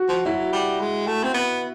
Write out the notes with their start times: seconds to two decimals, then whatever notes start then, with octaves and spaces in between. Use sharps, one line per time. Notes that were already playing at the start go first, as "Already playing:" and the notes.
Already playing: F#4
0.08 F3
0.26 F#3 E4
0.53 G3
0.80 G#3
1.07 A3
1.24 C4
1.34 B3